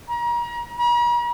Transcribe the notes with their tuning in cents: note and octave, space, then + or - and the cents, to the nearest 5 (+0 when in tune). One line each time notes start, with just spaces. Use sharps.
A#5 +35
A#5 +45